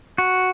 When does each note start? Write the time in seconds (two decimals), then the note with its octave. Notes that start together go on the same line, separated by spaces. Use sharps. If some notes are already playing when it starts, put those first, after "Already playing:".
0.18 F#4